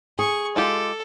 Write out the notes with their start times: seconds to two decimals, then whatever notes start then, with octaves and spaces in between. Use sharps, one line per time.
0.19 G#4 C#6
0.56 G#3 F4 G4 A4